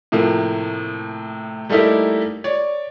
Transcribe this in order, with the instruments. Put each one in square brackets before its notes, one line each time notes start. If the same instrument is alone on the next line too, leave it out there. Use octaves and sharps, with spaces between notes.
[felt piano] A2 C3 F3 A#3
G3 A3 A#3 D#4 E4 G4
C#5 D5